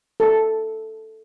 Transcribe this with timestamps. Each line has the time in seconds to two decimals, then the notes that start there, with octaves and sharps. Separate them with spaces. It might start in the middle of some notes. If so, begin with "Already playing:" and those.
0.20 A4